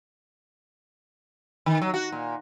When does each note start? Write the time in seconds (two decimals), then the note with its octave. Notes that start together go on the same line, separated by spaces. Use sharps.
1.66 D#3
1.82 F#3
1.94 F#4
2.12 A#2